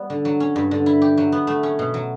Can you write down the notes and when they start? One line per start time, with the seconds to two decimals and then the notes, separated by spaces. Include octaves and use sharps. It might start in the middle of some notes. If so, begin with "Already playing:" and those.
Already playing: G3 B3
0.10 D3
0.25 F#3
0.40 C#4
0.56 G2
0.71 D3
0.86 E4
1.02 G4
1.17 F#3
1.32 B3
1.47 A3
1.63 C#4
1.79 B2
1.94 F#3